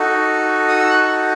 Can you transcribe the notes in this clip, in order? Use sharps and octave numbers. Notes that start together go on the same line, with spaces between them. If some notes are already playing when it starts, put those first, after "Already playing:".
Already playing: D#4 F#4 A4
D#6
E6
F#6